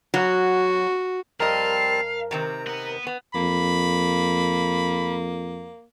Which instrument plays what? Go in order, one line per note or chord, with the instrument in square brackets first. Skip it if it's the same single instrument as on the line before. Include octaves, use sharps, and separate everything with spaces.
[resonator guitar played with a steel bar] F#3 [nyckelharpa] F#4
[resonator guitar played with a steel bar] F2 D#5 [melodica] G3 C4 A5 [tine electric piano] A#4 [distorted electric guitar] F5
[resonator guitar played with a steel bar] C3 D#3 C4 [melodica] A#5
[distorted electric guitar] B3 F#5
[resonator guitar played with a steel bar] B3
[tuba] F2 [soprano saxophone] A#3 [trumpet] B5